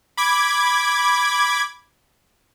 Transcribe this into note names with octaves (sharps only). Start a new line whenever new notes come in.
B5 D6 G#6